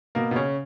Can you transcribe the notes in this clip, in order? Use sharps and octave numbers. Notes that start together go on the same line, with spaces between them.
B2 A#3
B2
C#3 C#4